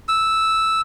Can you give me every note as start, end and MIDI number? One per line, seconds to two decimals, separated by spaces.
0.09 0.81 88